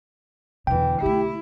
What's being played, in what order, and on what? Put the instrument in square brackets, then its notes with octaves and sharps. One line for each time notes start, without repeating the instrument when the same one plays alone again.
[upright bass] E2 B2 [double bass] D3 E3 [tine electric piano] G5
[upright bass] B1 A3 [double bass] E4 [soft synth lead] G4